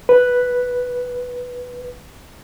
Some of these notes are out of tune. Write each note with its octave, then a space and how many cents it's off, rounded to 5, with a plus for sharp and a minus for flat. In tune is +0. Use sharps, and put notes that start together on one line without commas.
B4 +0